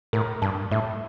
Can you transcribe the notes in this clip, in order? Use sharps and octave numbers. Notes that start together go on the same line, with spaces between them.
A2 A#4
G2 A5
A2 E5